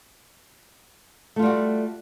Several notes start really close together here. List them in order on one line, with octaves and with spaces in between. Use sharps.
A3 F4 G3 F#4